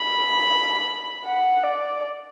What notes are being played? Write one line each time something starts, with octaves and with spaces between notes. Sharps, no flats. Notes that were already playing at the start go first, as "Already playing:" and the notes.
Already playing: B5
F#5
D5